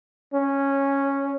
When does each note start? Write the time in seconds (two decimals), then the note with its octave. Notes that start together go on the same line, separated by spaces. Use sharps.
0.34 C#4